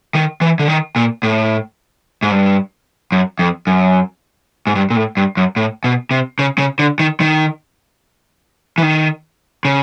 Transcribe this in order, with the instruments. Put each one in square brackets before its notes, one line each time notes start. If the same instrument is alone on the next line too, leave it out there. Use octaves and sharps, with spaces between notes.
[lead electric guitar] D#3
E3
D3
D#3
A#2
A2
G#2
G2
F#2
F2
F#2
G#2
G2
A#2
A2
G2
F#2
A2
B2
C3
C#3
C#3
D3
D#3
D#3
E3
D#3
C#3